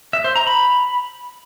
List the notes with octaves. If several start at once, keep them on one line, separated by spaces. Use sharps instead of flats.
E5
C5
A#5
B5